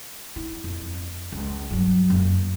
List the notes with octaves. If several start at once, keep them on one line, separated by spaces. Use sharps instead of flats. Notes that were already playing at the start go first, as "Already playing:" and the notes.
E4
F2
C#2
G2 F#3
F#2 A#3